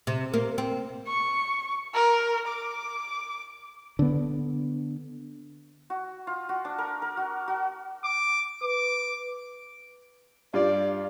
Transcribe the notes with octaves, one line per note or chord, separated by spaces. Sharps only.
C3
A#3
C4
C#6
A#4
D6
D3 B3
F#4
F4
F#4
D4
A#4
A#4
F#4
F#4
D6
B4 D6
G2 G3 F4 D5